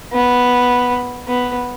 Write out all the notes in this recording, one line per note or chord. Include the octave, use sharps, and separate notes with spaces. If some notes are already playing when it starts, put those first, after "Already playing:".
B3
B3